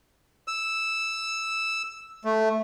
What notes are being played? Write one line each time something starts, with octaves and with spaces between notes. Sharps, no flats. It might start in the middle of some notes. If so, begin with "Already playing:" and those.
E6
A3